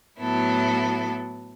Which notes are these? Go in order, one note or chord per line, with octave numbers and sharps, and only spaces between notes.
A2 F#3 B3 E4 A4